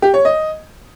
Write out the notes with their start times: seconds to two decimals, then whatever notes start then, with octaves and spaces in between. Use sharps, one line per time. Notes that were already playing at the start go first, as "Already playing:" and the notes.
0.02 G4
0.14 C#5
0.25 D#5